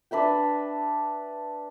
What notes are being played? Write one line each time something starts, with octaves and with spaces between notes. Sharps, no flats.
D4 B4 E5 G5